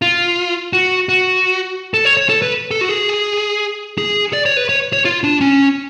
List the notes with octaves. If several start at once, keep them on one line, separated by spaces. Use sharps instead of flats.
F4
F#4
F#4
A4
C#5
C#5
A4
B4
A4
F#4
G#4
G#4
D5
C#5
B4
C#5
C#5
F4
D4
C#4